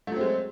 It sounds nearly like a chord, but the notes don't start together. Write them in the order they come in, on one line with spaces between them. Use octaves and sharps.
A3 F#3 C4 G#3